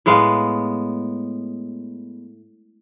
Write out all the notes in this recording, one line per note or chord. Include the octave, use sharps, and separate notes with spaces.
A2 G#3 B3 F5